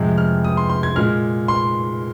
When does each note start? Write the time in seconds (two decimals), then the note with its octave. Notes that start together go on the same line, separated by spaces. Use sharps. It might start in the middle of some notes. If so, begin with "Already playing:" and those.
Already playing: F2 C3 G#3
0.18 F6
0.44 D#6
0.57 C6
0.70 C6
0.83 G#6
0.96 A#2 G#3 F6
1.48 C6